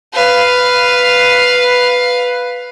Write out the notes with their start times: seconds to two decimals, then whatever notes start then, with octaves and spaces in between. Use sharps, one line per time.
0.13 B4 F5